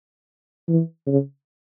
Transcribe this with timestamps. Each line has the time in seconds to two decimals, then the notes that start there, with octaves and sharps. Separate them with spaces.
0.69 E3
1.07 C#3